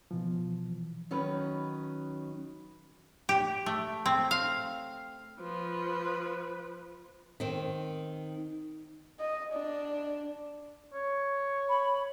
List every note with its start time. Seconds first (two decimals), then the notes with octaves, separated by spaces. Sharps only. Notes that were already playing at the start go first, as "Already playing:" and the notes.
0.11 B2 E3 F3
1.11 D#3 F#3 C#4 D#4 B4
3.29 G4
3.66 A3
4.06 C4
4.31 F5
5.40 F3 B4
7.40 D#3 C4
9.20 D#5
9.53 D4
10.93 C#5
11.69 B5